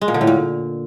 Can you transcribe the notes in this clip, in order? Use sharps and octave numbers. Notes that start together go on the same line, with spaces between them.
G#3
A#2
D3
A2
A#2